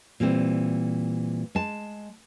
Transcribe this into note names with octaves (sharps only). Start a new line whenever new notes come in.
A#2 E3 G3 C4
G#3 A5